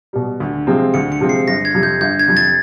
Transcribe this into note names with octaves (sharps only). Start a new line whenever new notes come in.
B2 G3
D2
C3 F3 G#3 C4
D2 C#7
C#7
C3 F3 G#3 C4
C7
G1 A#6
G#6
F2 C3
G6
G1 G6
G#6
F2 C3
A6